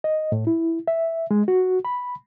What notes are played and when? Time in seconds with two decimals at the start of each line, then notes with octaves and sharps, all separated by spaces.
0.04 D#5
0.32 A2
0.47 E4
0.88 E5
1.31 G#3
1.48 F#4
1.85 B5